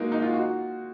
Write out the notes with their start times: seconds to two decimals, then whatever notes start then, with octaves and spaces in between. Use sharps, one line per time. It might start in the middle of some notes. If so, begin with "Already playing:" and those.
Already playing: G#3 A#3 D#4 F#4
0.12 D#4
0.22 F4
0.34 F#4